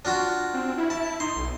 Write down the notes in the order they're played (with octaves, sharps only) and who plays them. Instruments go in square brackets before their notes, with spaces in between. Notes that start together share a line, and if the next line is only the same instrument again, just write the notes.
[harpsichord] D4 F4 F#4
[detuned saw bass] C4
E4
[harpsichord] A5
[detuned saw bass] D#4 [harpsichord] C6
[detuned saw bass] B1